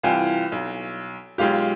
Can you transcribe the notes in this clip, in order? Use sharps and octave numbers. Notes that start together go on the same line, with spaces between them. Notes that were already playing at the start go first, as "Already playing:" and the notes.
C2 E3 F4 G5 G#5
B1
B1 G#3 F4 G4